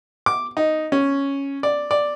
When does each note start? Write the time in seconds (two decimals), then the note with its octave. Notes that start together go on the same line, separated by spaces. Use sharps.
0.26 D6
0.57 D#4
0.92 C#4
1.63 D5
1.91 D5